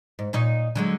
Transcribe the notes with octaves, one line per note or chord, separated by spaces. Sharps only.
G#2
A#2 D#4 C#5
D3 F#3 G#3